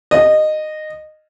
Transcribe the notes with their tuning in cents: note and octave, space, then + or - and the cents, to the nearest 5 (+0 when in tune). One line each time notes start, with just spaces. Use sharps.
D#5 -15